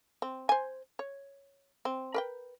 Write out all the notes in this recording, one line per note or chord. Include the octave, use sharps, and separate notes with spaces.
C4
C5 G#5
C#5
C4
A#4 B4 G5